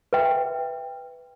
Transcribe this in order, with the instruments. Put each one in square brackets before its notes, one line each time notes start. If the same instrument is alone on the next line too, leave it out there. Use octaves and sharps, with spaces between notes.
[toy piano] B4 E5 G5